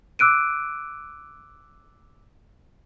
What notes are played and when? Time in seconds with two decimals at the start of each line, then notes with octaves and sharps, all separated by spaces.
0.19 D6 E6 F#6 D7 D#7